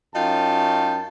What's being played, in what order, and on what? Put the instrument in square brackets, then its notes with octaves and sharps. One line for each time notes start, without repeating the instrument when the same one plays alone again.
[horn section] F#2 C#4 D#4 F4 G5 A5